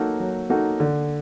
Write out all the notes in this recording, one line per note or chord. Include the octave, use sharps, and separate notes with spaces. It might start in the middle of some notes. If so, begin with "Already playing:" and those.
Already playing: F#3 A#3 D#4 F#4 A4
F#3
A#3 D#4 F#4 A4
D3